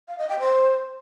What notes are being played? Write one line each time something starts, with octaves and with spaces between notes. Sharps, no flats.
F5
D#5
G5
C5